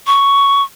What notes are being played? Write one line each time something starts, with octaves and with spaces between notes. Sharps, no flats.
C#6